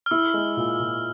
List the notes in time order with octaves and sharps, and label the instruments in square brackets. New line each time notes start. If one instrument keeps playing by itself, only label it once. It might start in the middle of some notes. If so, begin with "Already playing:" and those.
[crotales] F6
[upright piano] E4 [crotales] E6
[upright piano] G#3
A#2
A#2